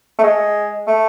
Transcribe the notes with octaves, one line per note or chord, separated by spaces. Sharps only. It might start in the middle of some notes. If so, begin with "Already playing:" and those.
A3
G#3
A3